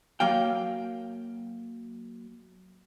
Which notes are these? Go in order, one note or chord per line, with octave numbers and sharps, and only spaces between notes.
F#3 A#3 F5 G5